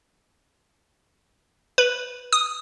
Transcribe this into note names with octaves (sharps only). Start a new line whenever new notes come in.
B4
D#6